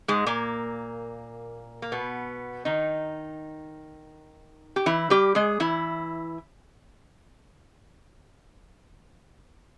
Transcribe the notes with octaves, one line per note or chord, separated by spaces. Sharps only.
G#2 G#3
A#2 A#3
A#3
B2 B3
D#3 D#4
G4
E3 E4
G3 G4
G#3 G#4
E3 E4